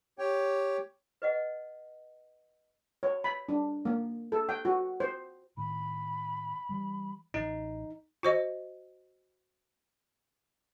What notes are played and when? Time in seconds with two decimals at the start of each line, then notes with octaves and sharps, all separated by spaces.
0.19 G4 C#5 G5
1.22 B4 D#5 F#5
3.03 C#5
3.24 B5
3.49 D4
3.85 A#3
4.32 A4
4.49 G5
4.65 F#4
5.00 C5
5.57 A2 D#3 B5
6.69 E3 G3
7.34 A1 E3 D#4
8.23 F#4 C5 D#5